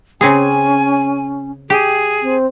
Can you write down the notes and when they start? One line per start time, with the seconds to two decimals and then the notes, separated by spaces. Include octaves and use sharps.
0.21 C#3 C4 C#4 G#4 G#5
1.70 G4 G#4
2.22 C4